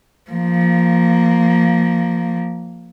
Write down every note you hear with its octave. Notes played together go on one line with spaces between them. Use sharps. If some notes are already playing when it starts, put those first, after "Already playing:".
F3 A#3